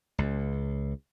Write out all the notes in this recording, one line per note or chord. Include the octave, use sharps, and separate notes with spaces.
C#2